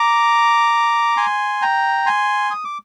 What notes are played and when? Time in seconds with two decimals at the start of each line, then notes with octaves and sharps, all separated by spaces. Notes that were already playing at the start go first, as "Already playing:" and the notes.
Already playing: A#5 D6
1.17 G#5 C6
1.62 G5 A#5
2.06 G#5 C6
2.51 D#6
2.65 D6